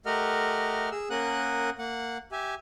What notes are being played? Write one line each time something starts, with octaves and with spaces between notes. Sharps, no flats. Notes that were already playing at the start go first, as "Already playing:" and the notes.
A3 G4 A#4 D#5 F#5 F6
G#4 E6
A#3 C#4 A#4 F#5 D#6 F#6
A#3 F#5
G4 E5 G#5